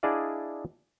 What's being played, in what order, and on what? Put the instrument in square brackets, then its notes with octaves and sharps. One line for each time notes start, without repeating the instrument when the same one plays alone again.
[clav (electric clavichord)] D4 E4 G#4 D5 D#5 F5